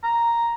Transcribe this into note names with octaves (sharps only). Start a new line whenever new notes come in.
A#5